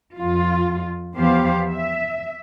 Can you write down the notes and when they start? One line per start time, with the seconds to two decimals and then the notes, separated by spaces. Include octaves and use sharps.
0.16 F2 F4
1.14 E2 F3 B3 G4 C5 F5
1.70 E5